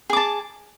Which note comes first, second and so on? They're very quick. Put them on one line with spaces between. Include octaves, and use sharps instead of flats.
G#4 D6 A5